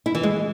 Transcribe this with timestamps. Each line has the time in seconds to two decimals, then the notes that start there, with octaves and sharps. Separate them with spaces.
0.06 E4
0.15 E3
0.23 G#3